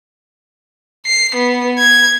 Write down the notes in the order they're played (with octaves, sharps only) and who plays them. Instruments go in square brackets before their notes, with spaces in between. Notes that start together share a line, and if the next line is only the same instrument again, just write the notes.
[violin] C7
B3
G#6